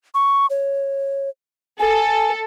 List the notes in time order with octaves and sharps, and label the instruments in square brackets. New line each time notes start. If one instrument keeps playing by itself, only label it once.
[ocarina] C#6
C#5
[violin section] A4 [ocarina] G#5